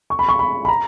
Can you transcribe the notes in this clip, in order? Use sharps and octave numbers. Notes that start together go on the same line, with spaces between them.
C#6
B5
C#6
B5
B5
A#5